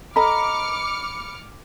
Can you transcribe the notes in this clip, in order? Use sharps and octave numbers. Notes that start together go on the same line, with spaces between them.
A4 D#5 A#5 B5 D6 F6 C#7